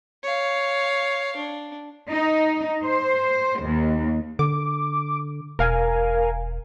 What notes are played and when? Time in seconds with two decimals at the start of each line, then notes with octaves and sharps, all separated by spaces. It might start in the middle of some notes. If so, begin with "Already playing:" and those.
0.23 C#5 F5
1.36 D4
2.11 D#4
2.85 C5
3.62 D#2
4.39 D3 D6
5.59 E1 A#4 F5 G#5